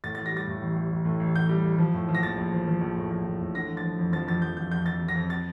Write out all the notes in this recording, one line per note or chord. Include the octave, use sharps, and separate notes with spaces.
A2 A6
A6
A1
A#6
G3 A6
A2
A1
A1
A1
A2
A1
A1 G6
G3
A1
F3
A2
F3
A#6
A#1 A6
A#1
F3
F3
A#1
A2
A#1
A2
A2
D3 A#6
F3
A6
F3
F2
F3 A6
F2 A6
F2 G6
F3 G6
F2 G6
F2 A6
F2
A#6
F2
A6